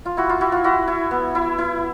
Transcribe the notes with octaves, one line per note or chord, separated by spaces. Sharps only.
F4
E4 F#4
F4
E4 F#4
F4
E4 F#4
E4
B3
E4
E4